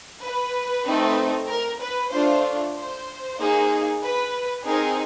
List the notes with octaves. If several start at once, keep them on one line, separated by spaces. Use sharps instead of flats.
B4
A3 C4 D#4
A#4
B4
A3 D4 F4 C5
C5
A#3 D#4 G#4
B4
C4 D#4 G#4 A#4